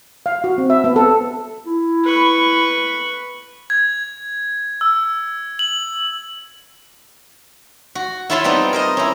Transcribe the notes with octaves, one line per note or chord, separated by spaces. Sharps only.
F5
F#4
C4
E5
B3
A4
E4
B4 C#6
G#6
E6
F#7
F#4
E4 F4 C#5 A5 B5 C6
G3 B3 C4 D#4
A#4 C5 D#5
C#4 E4